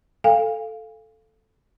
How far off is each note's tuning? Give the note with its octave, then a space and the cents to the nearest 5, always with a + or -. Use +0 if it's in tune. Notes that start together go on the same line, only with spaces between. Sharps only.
A4 +0 F5 +0 G#5 -40